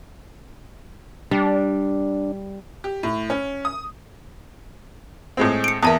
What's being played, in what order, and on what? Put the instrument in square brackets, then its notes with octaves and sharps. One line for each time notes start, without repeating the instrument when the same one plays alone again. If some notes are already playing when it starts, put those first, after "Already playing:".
[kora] G3 [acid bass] D4
[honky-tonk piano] G4
A2
C#4
D#6
[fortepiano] A2 G#3 C4
[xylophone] C#7 D7
[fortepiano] E2 A#3 [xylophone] E5 A5 D#6